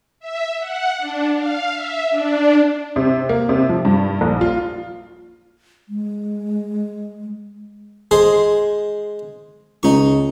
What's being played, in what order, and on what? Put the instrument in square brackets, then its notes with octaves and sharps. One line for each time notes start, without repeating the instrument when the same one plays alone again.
[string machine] E5
F#5
D4
F5
E5
D4
[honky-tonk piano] C3
A#3
C3
F3
G2
A#1
F4
[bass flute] G#3
[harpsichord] G#3 G#4 C5
[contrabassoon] C#2 [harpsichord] D#4 C#6